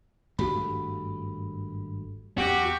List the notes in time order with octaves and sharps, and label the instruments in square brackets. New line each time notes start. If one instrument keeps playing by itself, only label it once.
[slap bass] G#1 G2 A3 [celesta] F#4 G4 B5
[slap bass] E2 [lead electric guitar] F#4 [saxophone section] G4